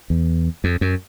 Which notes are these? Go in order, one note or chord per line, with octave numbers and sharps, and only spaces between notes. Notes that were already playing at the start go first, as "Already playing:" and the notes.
E2
F2
F#2